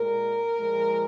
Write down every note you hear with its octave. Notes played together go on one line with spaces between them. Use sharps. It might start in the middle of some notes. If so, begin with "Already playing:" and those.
Already playing: A#2 G#3 A#4
A#2 F3 G#3